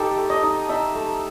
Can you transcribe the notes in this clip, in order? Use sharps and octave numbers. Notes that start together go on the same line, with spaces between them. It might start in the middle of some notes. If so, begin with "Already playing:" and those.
Already playing: D#4 G4 A4
A3
D#5
D#4
D#4 E5
A3